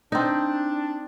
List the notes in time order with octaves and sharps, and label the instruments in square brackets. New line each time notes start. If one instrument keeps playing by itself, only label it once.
[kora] C4 D#4 [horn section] D4